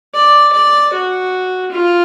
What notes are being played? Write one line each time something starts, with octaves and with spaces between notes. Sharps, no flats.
D5
D5
F#4
F4